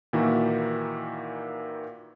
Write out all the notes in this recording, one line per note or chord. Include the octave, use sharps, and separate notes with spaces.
A#2 D#3 E3 A#3 E4 F#4